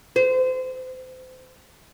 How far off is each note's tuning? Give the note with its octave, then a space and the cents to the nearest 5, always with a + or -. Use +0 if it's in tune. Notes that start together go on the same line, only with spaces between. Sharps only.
C5 -30